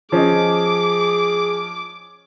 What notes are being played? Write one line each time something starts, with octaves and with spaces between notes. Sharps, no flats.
F3 C#4 G#4 D#5 D6